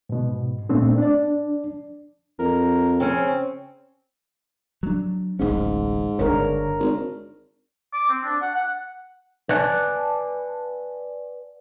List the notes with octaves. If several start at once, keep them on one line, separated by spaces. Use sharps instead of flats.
G#2 B2
A#2 A3 B3 C4 D4
D4 D5
F2 A#4
C#3 C4 C#4
F#3 D4
D1 A1 G#2 C#4
G1 C#3 D4 A#4 C#5
G#1
D6
C4
D4
F#5
F#5
B4 D5 F#5 G#5 A5